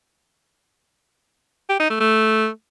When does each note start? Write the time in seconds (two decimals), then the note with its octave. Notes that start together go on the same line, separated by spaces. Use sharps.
1.69 G4
1.80 D#4
1.90 A3
2.00 A3